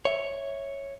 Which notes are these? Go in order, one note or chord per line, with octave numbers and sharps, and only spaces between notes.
C#5 E5